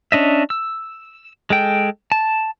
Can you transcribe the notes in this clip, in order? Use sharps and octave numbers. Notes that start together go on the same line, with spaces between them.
C#4 D4 D#5 E5
E6
G#3 A4 G5
A5